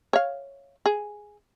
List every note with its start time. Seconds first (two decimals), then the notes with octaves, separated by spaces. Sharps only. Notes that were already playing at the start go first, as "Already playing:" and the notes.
0.13 C#5 F5
0.86 G#4